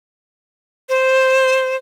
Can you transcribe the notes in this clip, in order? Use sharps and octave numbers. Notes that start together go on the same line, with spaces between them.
C5